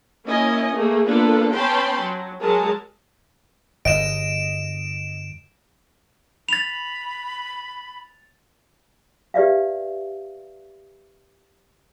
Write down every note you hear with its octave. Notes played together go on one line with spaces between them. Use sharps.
A#3 C#4 E4 D#5 G#5
A3 A#3 G#4
A#3 B3 D4 F4 A4 B4
B3 C#4 G5 A5 B5 C6
F#3
F#3 G#3 G#4 A#4 A5
G1 E2 D#5 D7 E7
B5 A6 F7
G4 B4 D5 E5 F5